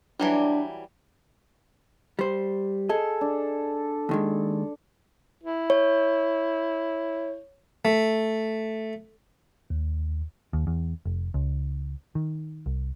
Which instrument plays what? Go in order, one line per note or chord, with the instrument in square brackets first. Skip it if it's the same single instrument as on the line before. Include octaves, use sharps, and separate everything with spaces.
[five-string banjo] E3 F#3 G3 [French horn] D4
[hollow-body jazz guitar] G3 C5
[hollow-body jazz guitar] G#4 D#5 [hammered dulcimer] A4
[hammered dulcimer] D4
[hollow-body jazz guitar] D#2 D#3 G#3
[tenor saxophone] E4
[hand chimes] C#5
[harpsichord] A3
[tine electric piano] D#2
[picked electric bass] D#2
E2
F1
C#2
D#3
C2